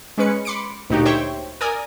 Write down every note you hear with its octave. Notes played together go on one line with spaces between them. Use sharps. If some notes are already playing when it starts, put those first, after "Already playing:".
G#3 C#4 B4 C#7
B5 C6 D6 C#7 D7
D2 A#2 D#4 F#4 G4
C5 C#5 E5 G5 C#6
A#4 D5 G#5 D#6